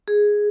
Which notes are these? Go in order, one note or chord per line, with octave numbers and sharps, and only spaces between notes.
G#4